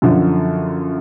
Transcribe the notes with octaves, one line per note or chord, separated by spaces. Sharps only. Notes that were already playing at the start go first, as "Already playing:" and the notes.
F#2 D3 F3